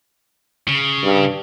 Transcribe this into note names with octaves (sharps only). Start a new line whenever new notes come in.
C#3
G2